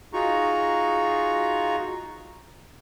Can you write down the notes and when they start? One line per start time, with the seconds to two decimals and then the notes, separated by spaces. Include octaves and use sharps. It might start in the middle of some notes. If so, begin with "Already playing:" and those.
0.13 D#4 F4 F#4 G#4 A#5 C#6